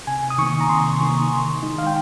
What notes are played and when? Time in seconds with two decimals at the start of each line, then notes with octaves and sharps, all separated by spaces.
0.07 C3 G#5
0.30 D#6
0.38 D#3 A#3 C#6
0.61 A#5
0.69 C3 C6
1.01 D#3 A#3
1.32 D#3
1.63 G#3 D#4
1.78 F5
1.87 G5